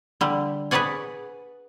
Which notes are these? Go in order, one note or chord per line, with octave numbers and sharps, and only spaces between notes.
D3 G3
G#4 B4 C#5 D5 F#5 G#5